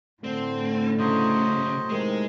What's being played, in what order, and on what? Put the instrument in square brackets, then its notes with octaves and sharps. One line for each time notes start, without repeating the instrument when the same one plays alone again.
[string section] A2 [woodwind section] D3 [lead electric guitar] C4
[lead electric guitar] C#3 [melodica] F#3 C5 D#5
[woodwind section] C3 D#3 [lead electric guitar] G#3